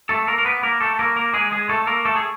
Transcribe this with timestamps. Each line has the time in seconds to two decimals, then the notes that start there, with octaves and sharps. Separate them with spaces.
0.09 A3 A4
0.28 A#3 A#4
0.38 A#4
0.45 B3 B4
0.63 A#3 A#4
0.81 A3 A4
0.99 A#3 A#4
1.16 A#3 A#4
1.34 G#3 G#4
1.52 G#3 G#4
1.69 A3 A4
1.87 A#3 A#4
2.05 A3 A4
2.16 G#4